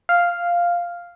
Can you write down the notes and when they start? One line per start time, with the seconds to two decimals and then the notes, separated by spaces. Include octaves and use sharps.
0.09 F5